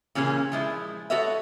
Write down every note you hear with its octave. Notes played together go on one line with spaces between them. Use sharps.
A#2 C#3 E3 C#4 G#4
F3 G#3 E4
F#4 A4 B4 C#5 D#5 E5